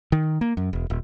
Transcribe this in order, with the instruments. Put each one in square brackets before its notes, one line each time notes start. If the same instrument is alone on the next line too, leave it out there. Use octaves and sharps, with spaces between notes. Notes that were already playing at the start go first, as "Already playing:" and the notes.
[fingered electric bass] D#3
A#3
F#2
E1
D#1